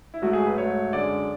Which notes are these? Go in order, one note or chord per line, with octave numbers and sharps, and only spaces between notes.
E4
G#2 F#3 A3 F#4
G#4
B4
G#2 F#3 A3 C#5
F#2 D3 G#3 D5